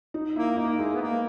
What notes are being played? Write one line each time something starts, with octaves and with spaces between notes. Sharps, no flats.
D#4
A#3 E4
A#3 D#4
G#3 E4
B3
A#3